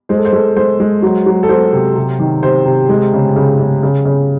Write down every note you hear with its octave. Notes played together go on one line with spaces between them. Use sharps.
G#3 C5
A4
C5
G#3 A4
G#3 C5
G#3
F#3
F#3
A4
F#3 C5
C3
C3
D#3
C3 C5
C3
G#3
C#3
C#3
C#3
C#3
C#3